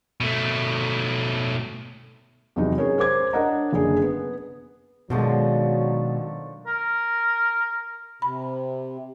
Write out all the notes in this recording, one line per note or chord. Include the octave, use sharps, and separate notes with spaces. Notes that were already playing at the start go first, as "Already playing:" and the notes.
B2 A3
E2 C3 F#3 D#4
C#4 G#4 A#4 C#5
A#4 C5 D6 G#6
D4 A#4 C#5 D#5 F#5 A#5
F#1 D3 G#4
B3
B2 D3 D#3 F3 F#3 G#3 A3
A#4
C3 B5